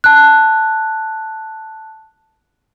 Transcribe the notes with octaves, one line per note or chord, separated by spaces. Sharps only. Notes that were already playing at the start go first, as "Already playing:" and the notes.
A5 F#6